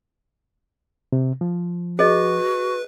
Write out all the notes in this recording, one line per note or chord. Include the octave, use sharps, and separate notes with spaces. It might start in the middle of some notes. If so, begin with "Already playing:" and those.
C3
F3
F#4 G#4 B4 D#5